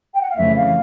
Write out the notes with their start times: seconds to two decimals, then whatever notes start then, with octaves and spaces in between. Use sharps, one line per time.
0.14 G5
0.21 F#5
0.29 F5
0.37 F2 C#3 E3 A3 E5
0.56 F5